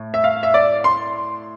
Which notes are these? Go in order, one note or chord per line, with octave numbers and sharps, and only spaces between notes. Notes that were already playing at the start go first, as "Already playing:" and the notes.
Already playing: A2
E5
F5
E5
D5
C6